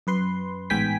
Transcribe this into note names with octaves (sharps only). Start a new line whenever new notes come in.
F#2 B4 C6
A1 G#2 B3 G5 G#5 B6